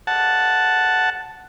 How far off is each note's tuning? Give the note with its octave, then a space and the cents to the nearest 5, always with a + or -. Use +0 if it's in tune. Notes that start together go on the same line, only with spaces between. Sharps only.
F#5 +0 A5 +0